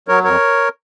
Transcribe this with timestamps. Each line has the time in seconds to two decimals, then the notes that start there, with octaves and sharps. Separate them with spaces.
0.08 F#3 A#4 C#5
0.24 F2 A#4 C#5